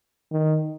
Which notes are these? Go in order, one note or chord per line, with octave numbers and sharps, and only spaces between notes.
D#3